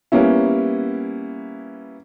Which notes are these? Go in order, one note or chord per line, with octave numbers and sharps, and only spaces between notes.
G3 A#3 B3 C#4 E4